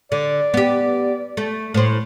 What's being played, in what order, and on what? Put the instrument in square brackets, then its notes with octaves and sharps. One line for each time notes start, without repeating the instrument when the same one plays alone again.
[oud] D3 [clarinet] D5
[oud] B3 G4
A3
A2 C5